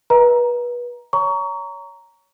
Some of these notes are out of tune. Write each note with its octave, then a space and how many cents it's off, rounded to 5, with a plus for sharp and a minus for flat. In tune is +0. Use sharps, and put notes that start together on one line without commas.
B4 -30 D#5 +35 A#5 +15
C#5 +20 A#5 +0 C#6 +25